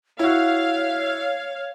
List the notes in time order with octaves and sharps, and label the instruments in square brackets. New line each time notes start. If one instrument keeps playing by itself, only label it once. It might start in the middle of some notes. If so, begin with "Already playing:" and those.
[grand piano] E4 F#4 [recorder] C#5 [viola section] F5